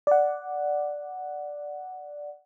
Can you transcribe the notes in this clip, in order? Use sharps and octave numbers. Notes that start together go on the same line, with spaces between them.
D5 F#5